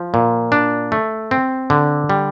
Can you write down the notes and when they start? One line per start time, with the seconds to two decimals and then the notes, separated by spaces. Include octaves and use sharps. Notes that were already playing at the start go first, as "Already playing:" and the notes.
Already playing: F3
0.14 A#2
0.52 D4
0.92 A3
1.31 C4
1.70 D3
2.10 G3